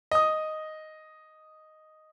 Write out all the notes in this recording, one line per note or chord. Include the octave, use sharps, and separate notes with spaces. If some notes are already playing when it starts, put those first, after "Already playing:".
D#5 D#6